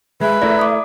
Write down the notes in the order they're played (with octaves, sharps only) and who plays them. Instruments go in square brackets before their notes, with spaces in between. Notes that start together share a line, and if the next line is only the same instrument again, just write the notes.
[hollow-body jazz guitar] G#3 [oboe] B4 [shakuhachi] E5
[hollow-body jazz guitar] A3 E4 A#4 [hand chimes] D5
[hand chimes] D6 D#6